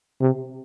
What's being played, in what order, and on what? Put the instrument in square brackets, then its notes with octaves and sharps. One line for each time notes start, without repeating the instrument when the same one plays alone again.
[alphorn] C3